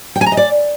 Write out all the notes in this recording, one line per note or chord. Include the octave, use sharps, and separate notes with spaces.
G5
G#5
A#5
D#5
D5